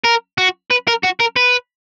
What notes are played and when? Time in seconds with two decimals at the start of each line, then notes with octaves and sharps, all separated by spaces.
0.05 A#4
0.38 F#4
0.70 B4
0.87 A#4
1.03 F#4
1.20 A#4
1.36 B4